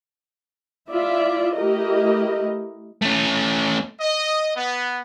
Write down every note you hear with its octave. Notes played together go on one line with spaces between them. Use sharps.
E4 F4 D5 E5
A3 E4 G4 A#4 D#5
A3 C#4
D#5
B3